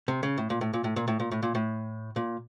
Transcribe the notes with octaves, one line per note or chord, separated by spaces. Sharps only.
C3
C#3
A2
A#2
A2
A#2
A2
A#2
A2
A#2
A2
A#2
A2
A#2